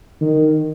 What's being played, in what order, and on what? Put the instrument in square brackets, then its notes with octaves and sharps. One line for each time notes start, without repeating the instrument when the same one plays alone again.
[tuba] D#3